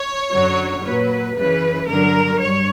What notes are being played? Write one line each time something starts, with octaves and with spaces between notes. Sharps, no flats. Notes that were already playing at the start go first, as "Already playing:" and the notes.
Already playing: C#5
F#2 D3 F#3
A#2 F#3 B4
F#2 C#3 E3 B4
G2 D3 F#3 A#4
G2 C#5